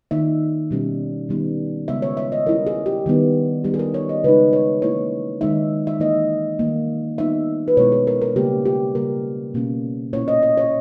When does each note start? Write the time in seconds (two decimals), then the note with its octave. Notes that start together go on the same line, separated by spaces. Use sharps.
0.11 D#3 A#3 D#4 E5
0.71 B2 G3 C#4
1.29 D#3 G3 B3 D#4
1.88 C#3 G#3 B3 E5
2.02 C#5
2.17 E5
2.32 D#5
2.46 G3 C#4 E4 A#4
2.67 G#4
2.86 G4
3.06 D#3 G3 B3 D#4
3.64 G3 B3 D#4 G4
3.74 G#4
3.79 A#4
3.94 C#5
4.09 D#5
4.24 C#3 G#3 D#4 B4
4.53 C#5
4.82 E3 A#3 C#4 E4 C#5
5.41 D#3 G#3 D#4 E5
5.87 E5
6.00 E3 A#3 D#4 D#5
6.59 D#3 G3 A#3
7.18 G3 B3 D#4 E5
7.68 B4
7.77 B2 G#3 B3 E4 C#5
7.92 G#4
8.07 A#4
8.22 A#4
8.36 C#3 G3 A#3 G4
8.65 G4
8.95 C#3 G3 A#3 A#4
9.54 B2 A#3 C#4
10.13 A#2 A#3 C#4 E4 C#5
10.28 D#5
10.43 D#5
10.57 C#5